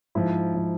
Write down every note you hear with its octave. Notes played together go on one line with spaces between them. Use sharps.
G#2 F3 E4
F3